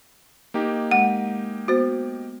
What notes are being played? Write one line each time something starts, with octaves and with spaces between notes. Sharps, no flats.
A#3 D#4 G4
G#3 F#5
B3 F#4 C5